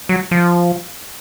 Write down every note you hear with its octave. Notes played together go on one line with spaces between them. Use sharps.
F#3
F3